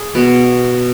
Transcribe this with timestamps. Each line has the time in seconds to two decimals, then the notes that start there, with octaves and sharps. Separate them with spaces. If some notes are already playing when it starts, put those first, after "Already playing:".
Already playing: G#4
0.15 B2 B3 B4